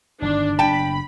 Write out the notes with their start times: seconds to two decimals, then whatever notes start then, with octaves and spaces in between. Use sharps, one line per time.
0.22 G1 D#3 D4
0.59 F#1 C3 D4 G5 A5 B5